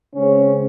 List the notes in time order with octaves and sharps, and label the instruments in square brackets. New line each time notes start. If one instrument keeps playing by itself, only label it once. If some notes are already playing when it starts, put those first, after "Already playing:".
[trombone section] C#3 G#3 C4 C#4